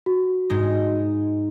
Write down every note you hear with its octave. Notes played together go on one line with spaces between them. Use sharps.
F#4
G#2 G#3 D#4